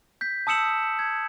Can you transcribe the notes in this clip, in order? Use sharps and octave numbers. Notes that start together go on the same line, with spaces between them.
G6 B6
A5 D#6 E6 C#7 E7 F#7
G#6